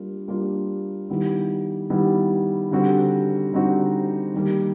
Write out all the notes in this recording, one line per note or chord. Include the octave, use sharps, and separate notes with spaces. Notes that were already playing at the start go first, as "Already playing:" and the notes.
Already playing: G3 A#3 D4 F4
G3 A#3 D4 F4
D#3 G3 B3 E4
D#3 G3 B3 E4
D3 G3 C4 D#4 F#4
D3 G3 C4 D#4 F#4
D#3 G3 A#3